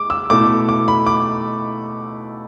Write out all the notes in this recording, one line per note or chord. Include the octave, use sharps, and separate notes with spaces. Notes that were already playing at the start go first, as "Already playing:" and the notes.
Already playing: G#3 D6
E6
B2 A3 E4 D6
D6
B5
D6